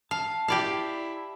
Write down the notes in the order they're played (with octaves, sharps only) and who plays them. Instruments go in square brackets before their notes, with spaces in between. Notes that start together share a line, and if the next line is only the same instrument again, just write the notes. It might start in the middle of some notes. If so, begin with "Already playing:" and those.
[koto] F5 [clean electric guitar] A5
[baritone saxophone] E4 [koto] G4 D5 F5